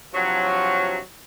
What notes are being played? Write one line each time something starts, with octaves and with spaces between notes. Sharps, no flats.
G2 C3 F3 F#3